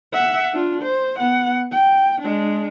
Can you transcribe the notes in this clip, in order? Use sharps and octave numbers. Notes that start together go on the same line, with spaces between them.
E5 F#5
D4 F4
C5
B3 F#5
G5
G#3 D4